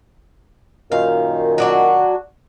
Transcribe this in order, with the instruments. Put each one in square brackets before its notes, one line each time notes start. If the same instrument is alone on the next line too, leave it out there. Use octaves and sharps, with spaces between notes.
[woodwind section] F#2 A#2 D#3 [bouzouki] F5
[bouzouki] F#3 D4 F#4